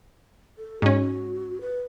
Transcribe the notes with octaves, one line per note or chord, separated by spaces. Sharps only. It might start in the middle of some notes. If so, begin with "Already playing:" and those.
A4
G#2 C#4 F#4
B4